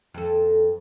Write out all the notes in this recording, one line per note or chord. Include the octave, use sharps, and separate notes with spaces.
F2 A4